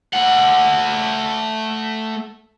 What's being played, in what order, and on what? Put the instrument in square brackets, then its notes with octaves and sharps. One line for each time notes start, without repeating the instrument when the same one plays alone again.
[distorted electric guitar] A3 F#5